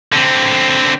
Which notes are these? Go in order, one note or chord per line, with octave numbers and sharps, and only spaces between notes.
D3 C4